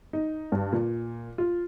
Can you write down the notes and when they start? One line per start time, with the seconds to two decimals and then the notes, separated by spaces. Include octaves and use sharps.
0.13 D#4
0.52 G2
0.72 A#2
1.38 F4